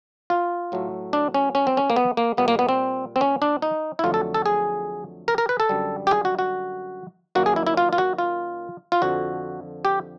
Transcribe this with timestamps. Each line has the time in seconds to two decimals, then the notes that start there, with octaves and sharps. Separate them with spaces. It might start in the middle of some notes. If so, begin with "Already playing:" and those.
0.30 F4
0.72 A2 F#3 A3
1.13 D4
1.34 C#4
1.55 C#4
1.67 C4
1.77 C#4
1.90 A#3
1.96 B3
2.17 A#3
2.37 A#2 G3 A#3 B3
2.48 A#3
2.59 B3
2.69 C4
3.16 C4
3.21 C#4
3.42 D4
3.62 D#4
3.99 E4
4.04 F2 D3 F#3 A3 F4
4.14 A4
4.34 A4
4.46 G#4
5.28 A#4
5.38 A#4
5.49 B4
5.60 A4
5.69 F#2 D3 G3
6.07 G4
6.11 G#4
6.25 F#4
6.39 F#4
7.35 F#2 D#3 F#3 A#3 F#4
7.46 G#4
7.56 E4
7.67 E4
7.77 F4
7.93 F4
7.98 F#4
8.18 F4
8.92 F4
9.02 F2 D3 F3 F#4
9.85 G4